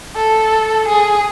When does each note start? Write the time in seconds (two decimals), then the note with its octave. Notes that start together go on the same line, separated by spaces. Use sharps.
0.15 A4
0.88 G#4